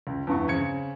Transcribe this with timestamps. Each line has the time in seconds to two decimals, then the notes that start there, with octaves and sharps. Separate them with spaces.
0.07 C#2
0.27 E2 G2 C#6
0.48 C#3 C4 G#6 C#7